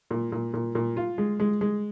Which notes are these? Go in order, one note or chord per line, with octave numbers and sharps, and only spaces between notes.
A#2
A#2
A#2
A#2
F4
G#3
G#3
G#3